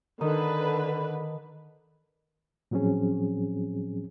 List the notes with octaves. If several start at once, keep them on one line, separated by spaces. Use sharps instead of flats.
D3 D#3 B4
A2 F3 F#3 C4 C#4 G#4